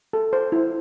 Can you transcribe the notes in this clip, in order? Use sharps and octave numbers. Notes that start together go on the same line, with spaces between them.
A4
C5
E4